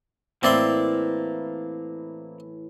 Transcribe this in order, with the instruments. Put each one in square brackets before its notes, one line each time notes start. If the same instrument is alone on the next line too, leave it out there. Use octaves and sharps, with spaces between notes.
[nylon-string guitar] A2 E3 [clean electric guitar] A#3 D5 [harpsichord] C4 E5 C6